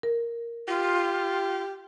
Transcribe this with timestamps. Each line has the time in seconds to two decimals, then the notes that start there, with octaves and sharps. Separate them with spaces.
0.03 A#4
0.68 F4 G4